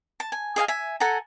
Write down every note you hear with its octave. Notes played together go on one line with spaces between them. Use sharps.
A5
G#5
G#4 D#5 F5 G#5
E5 G#5
A4 F#5 G#5 A#5